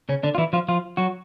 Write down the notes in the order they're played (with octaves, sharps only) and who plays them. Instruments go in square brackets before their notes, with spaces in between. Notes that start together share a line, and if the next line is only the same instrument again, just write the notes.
[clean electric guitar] C#3 C#4
D3 D4
F4
E3 E4
F3 F4
F3 F4
F#3 F#4